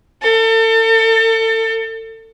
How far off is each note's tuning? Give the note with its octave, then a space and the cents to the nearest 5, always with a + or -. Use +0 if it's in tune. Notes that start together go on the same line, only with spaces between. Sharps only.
A4 +35